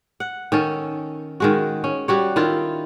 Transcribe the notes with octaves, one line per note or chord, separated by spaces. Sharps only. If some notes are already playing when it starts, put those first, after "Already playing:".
F#5
D#3 C#4 A4
D#3 G#3 F#4
C#4
G3 F#4 C#5
D#3 E4 F4 A4